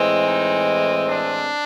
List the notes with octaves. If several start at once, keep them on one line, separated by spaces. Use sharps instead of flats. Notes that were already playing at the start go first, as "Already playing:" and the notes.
Already playing: A2 E3 G#3 C4
D#4
D4